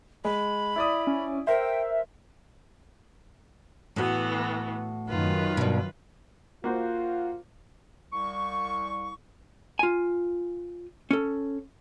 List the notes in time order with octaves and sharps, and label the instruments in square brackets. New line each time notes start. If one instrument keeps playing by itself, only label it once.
[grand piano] G#3 [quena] B5
[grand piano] E4 D5 D#6
[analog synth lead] C#4
[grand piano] A#4 C5 [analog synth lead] E5 [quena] G5
[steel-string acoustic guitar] A2 F#4 [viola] E3 B3
[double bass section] F#2 D#3 [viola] F4 B4
[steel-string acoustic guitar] G2 B2
[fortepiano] A#3 F#4 C5 [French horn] F4
[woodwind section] C2 C#6
[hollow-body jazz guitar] F4 G#5
C#4 A4